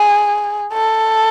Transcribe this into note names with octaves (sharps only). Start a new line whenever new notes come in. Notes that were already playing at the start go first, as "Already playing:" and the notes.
Already playing: G#4
A4